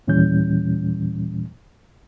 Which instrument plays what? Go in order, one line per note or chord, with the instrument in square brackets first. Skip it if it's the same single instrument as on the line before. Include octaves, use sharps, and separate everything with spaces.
[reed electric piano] D#2 A#2 E3 G3 C#4 G6